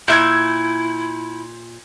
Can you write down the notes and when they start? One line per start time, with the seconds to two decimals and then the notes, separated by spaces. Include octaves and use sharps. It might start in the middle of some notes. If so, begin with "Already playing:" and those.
0.08 A#2 E4 E5 G6 G#6